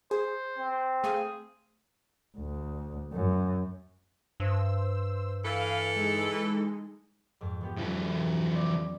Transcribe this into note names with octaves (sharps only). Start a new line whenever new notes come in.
G#4 C5
C4
A3 G#4 F5
D2
F#2
G2 C5 E6
E3 A4 F5
G#3 D#4
F2 G#2
F3 B3 G4
E3 F#3 C#4 F4 A4
C#4
B3 C4 D5